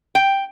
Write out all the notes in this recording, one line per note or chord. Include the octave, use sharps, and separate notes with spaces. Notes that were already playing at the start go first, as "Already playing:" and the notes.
G5